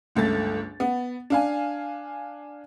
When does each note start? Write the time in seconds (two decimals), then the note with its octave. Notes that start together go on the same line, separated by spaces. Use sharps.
0.15 G1 C#2 A3 A6
0.80 B3
1.30 D4 F5 G#5